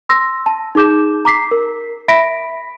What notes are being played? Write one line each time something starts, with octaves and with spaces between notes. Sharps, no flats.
C6 E6 A#6
A5
D#4 G#4 D6 G6 E7
A#5 D6 B6 C7
A#4
E5 B5 A#6 B6 D7